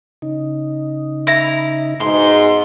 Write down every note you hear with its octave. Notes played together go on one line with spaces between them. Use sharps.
C#3 D#4
E4 A#5
G#2 B2 C6